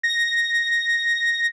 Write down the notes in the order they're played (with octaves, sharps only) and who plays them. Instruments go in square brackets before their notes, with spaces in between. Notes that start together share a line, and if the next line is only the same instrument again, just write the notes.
[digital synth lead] A#6